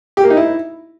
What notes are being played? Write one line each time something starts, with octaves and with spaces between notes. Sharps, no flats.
G4
A#3
D#4
E4